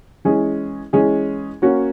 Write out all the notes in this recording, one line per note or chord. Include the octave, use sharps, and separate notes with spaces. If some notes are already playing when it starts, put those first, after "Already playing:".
E3 G#3 C#4 G#4
E3 G#3 C#4 G#4
A#3 C#4 F#4 C#5